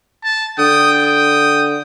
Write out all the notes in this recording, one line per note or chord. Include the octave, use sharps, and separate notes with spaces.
A5
D3 G5 D#6
D#6